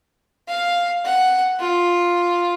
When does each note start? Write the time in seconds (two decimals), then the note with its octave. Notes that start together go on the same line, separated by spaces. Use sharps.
0.49 F5
1.05 F#5
1.60 F4